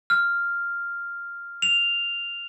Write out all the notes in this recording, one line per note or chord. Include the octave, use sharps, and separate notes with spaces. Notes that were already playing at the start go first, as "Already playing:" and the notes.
F6
F7